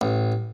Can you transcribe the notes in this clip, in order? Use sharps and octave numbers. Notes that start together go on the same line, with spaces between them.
A1